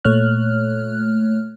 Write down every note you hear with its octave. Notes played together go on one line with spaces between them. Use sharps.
A#2 A3 C#5 F6 F#6